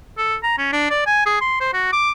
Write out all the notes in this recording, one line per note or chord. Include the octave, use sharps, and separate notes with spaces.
A4
A#5
C#4
D4
D5
G#5
G#4
C6
C5
F#4
D6